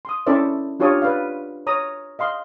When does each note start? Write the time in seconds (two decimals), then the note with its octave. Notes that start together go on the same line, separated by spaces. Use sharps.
0.05 C6 D#6
0.26 C#4 E4 A4 C5 D5 E5
0.80 D4 F4 G4 C#5 A5 D#6
1.02 B4 D5 F5
1.67 C#5 A#5 D#6
2.19 D#5 F5 C6